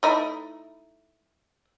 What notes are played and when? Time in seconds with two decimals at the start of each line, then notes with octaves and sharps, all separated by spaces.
0.03 A3 D#4 E4